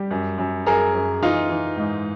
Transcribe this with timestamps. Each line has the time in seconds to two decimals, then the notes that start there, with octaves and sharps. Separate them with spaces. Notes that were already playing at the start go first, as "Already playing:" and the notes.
Already playing: G3 G4
0.11 F#2
0.38 F#2
0.66 F#2 G#4 A#4
0.95 F#2
1.22 E3 D#4 F4
1.49 E3
1.77 G#2